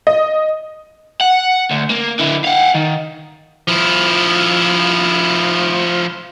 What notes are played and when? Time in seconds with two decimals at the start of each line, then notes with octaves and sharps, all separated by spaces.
0.07 D#5
1.21 F#5
1.71 D2
1.90 A#3
2.19 D3 E4
2.44 F5 F#5
2.74 D#3
3.68 F3 E4